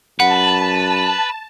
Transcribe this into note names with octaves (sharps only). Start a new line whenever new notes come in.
F#2 B4 F#5 A5